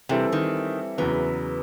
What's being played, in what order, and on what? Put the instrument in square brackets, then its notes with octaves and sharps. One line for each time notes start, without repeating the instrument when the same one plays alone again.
[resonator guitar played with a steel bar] C3 [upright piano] E3 G3 C4 E4 A4
[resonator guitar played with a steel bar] D#3
[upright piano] E2 C#3 F#3 B3 [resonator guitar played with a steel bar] E3